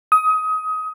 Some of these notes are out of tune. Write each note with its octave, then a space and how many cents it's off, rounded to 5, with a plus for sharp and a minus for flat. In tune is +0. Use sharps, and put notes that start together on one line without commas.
D#6 +25